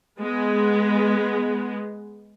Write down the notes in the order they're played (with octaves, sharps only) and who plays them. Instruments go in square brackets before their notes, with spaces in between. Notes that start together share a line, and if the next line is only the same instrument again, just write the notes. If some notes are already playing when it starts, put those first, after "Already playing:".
[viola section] G#3 B3